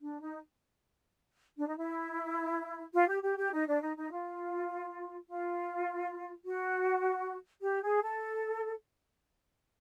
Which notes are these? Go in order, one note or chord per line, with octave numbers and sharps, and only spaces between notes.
D4
D#4
D4
D#4
E4
F4
G4
G4
G4
D#4
D4
D#4
D#4
F4
F4
F#4
G4
G#4
A4